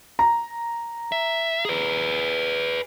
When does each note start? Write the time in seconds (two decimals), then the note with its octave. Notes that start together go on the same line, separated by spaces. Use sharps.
0.19 A#5
1.12 E5
1.65 G#4 B4